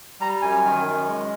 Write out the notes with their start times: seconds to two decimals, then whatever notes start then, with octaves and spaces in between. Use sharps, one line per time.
0.20 G3 A#5
0.42 F#2 G#5
0.65 D#3
0.86 F#2
1.07 G#3